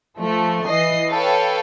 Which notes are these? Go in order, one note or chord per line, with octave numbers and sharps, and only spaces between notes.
F3 A3
E3 D#5 C7
A4 B4 C#5 F5 G5